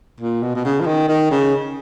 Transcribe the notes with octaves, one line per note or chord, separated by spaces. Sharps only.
A#2
B2
B2
C#3
F3
D#3
D#3
C#3